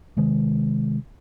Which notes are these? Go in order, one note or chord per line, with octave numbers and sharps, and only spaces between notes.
C3 D#3 G#3